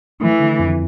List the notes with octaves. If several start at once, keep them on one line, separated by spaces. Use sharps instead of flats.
E3 A3
D3
F2